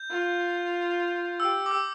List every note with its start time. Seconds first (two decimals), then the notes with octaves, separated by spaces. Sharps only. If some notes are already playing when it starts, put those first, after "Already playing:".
Already playing: G6
0.10 F4
1.40 G4 E6
1.66 D6
1.71 E6